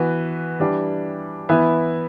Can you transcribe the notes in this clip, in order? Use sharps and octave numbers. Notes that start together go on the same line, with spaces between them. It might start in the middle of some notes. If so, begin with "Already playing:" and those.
Already playing: E3 B3 F#4 B4
E3 G3 D4
E3 B3 E4 B4